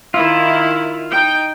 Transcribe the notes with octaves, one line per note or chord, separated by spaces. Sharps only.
D#3 E4 F4
D#4 G5